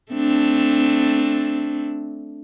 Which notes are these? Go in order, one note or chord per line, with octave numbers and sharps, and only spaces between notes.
A3 C4 D4